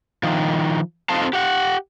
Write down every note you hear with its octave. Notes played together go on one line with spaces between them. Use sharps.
D#3 F3
C4 D#4 F4 A4 F5 A5
G4 F#5